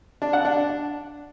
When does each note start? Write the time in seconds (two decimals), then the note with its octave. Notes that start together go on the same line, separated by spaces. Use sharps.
0.22 D4
0.33 F#5
0.45 D4